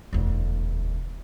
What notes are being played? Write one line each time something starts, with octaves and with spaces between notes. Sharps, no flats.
E1 D2